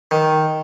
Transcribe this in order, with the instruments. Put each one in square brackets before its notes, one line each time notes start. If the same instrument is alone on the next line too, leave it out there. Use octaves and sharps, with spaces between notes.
[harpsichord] D#3